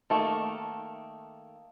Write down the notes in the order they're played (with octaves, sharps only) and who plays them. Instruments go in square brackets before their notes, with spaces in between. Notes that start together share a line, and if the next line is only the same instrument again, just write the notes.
[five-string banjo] D#3 A3 A#3